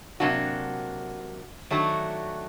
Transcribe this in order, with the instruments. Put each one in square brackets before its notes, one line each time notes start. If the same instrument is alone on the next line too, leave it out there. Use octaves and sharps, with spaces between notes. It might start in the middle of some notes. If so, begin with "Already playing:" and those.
[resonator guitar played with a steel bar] C3 F#3 A#3 D4 F#4
D#3 F#3 A3 D4 F#4